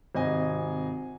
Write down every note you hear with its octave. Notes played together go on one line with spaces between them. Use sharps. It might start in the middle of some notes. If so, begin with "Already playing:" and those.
G#1 C3 D#5 G#5